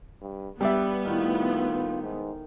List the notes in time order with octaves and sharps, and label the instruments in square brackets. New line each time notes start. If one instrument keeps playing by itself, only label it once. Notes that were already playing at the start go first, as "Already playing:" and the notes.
[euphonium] G2
[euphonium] G2 [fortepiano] G3 D5 E5 [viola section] B3
[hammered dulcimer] A2 D#3 [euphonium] F4
[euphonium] G#2